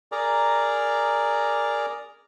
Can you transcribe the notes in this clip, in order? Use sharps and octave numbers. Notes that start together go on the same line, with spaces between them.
G#4 A#4 D5 A#5